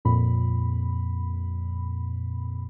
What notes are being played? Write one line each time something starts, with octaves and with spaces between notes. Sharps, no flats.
F2 A#2 B5